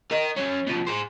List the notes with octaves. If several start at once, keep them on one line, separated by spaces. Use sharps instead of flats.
A#4 D#5
F#2 C#4
B2 F3
G#4 C5